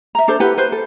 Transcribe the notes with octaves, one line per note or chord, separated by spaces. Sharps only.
E5 A#5
D4 A4 C5
E4 G4 B4 F#5
B4 C5
A4